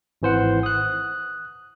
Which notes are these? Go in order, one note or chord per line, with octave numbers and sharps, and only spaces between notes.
G#1 E3 C5 F#5
D#6 F#6